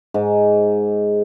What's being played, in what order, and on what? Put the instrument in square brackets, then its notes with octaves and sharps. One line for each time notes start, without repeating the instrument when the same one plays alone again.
[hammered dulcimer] G#2